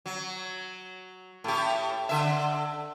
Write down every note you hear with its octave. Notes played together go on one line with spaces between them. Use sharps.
F#3
A2 G4
D3 E5